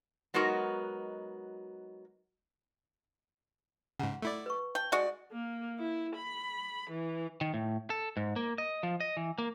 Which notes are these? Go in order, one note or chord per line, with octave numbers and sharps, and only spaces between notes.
F#3 G#3 B3 D#4 F#4 A#4
G#2 C#3 F#5 A#5
A3 E4 D5
B4 C#6
G5 A5
G#3 F#4 D5 E5
A#3
E4
B5
E3
D#3
A2
A4
G#2
A#3
D#5
F3
D#5
E3
A#3